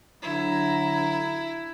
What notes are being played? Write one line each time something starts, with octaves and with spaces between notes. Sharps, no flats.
D3 F#3 E4 A#5